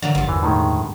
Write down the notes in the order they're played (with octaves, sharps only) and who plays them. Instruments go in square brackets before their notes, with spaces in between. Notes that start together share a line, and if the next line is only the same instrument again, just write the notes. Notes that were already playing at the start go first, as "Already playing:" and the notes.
[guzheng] D3 F#3 A#3 [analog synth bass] E3
[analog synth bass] A1 [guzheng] G2 F3
[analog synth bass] E2 [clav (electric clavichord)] E3
[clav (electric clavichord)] A2 D#3 G#3